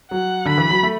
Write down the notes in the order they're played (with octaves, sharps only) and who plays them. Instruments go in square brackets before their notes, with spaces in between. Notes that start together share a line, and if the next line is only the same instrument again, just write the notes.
[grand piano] F#3 [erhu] F#5
[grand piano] D3 [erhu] B5
[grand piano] E3
F#3
A3